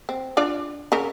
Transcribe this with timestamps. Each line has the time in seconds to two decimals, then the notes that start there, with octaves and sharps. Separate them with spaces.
0.09 C4
0.37 D4 F4 D5
0.92 C#3 A#4